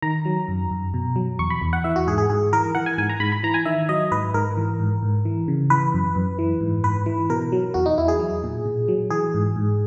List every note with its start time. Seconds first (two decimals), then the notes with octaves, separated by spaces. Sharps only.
0.02 D#3 A#5
0.25 F#3
0.48 F#2
0.71 F#2
0.94 B2
1.16 F#3
1.39 E2 C#6
1.50 B5
1.62 E2
1.73 F#5
1.84 E3 E5
1.96 F#4
2.07 G#2 G#4
2.18 G#4
2.30 G#2 G#4
2.53 E3 A#4
2.75 E3 F#5
2.86 G#5
2.98 G#2 G#5
3.10 A#5
3.20 G#2 B5
3.32 B5
3.43 E3 A#5
3.54 G#5
3.65 D#3 E5
3.89 F#3 D#5
4.12 G#2 B4
4.34 G#2 A#4
4.57 E3
4.80 G#2
5.02 G#2
5.25 E3
5.48 C#3
5.70 E3 B4
5.94 F#2
6.16 F#2
6.39 E3
6.61 G#2
6.84 G#2 B4
7.06 E3
7.29 B2 A#4
7.52 F#3
7.74 E2 F#4
7.86 D#4
7.98 E2 E4
8.08 G#4
8.20 F#3
8.43 A#2
8.66 A#2
8.88 F#3
9.10 E3 G#4
9.34 G#2
9.56 G#2